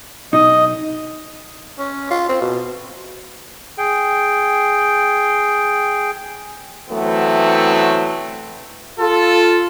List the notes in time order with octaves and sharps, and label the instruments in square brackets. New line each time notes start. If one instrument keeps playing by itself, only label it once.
[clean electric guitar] B1 D#4 [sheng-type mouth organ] D#5
[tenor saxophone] C#4
F4
C4
B2
[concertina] G#4 G5
[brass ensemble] E3 F#3 A3 B3 C4
F4 A4